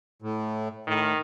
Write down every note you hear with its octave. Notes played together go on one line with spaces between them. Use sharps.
A2
A2 D#3